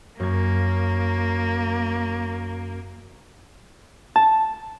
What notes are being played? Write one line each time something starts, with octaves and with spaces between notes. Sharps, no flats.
F#2 A#3 G#6
A5